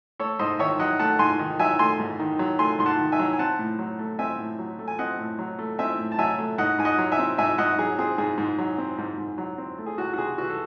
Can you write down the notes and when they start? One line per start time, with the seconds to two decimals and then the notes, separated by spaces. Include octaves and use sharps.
0.19 A3 A4 C#5
0.39 G#2 C5 D#5
0.59 D#3 C#5 E5
0.79 F#3 D#5 F#5
0.99 A3 F#5 A5
1.19 G#2 G#5 C6
1.39 D#3
1.59 F#3 E5 G#5
1.79 A3 G#5 C6
1.99 G#2
2.19 D#3
2.39 F#3
2.59 A3 G#5 C6
2.79 G#2 C6
2.86 F#5 A5
2.99 D#3
3.12 E5 G#5
3.19 F#3
3.33 G#5
3.39 C4 F#5 A5
3.59 A2
3.79 F#3
3.99 A3
4.19 C4 E5 G#5
4.39 A2
4.59 F#3
4.79 A3
4.88 G#5
4.99 C4 D#5 F#5
5.18 A2
5.39 F#3
5.59 A3
5.79 C4 E5 G#5
5.99 A2
6.12 A5
6.19 F#3 E5 G#5
6.38 A3
6.58 G#2 D#5 F#5
6.79 G#2 G#5
6.85 D#5 F#5
6.98 F#3
7.12 E5 G#5
7.19 C4
7.38 G#2 E5 G#5
7.58 G#2 D#5 F#5
7.78 F#3 G#4
7.98 C4 G#4
8.18 G#2 G#4
8.38 G#2
8.58 F#3
8.78 C4
8.98 G#2
9.18 G#2
9.38 F#3
9.58 C4
9.78 A3
9.86 G#4
9.98 C#2 F#4
10.13 F#4
10.18 C3 G#4
10.38 E3 F#4
10.50 A4